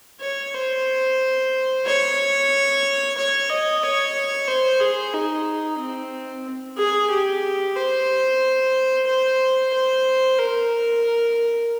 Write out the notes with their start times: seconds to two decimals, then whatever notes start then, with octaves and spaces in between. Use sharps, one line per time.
0.21 C#5
0.54 C5
1.85 C#5
3.17 C#5
3.49 D#5
3.83 C#5
4.48 C5
4.80 G#4
5.14 D#4
5.79 C4
6.77 G#4
7.10 G4
7.76 C5
9.07 C5
9.74 C5
10.39 A#4